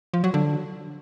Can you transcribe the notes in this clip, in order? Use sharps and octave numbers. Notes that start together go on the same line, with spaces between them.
F3
F#3
D3